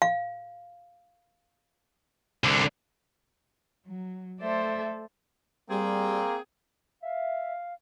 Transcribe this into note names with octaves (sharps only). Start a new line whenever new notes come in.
F5
C2 D3
F#3
A3 A4 C5 D5 E5
G3 A#3 C4 G#4
E5 F5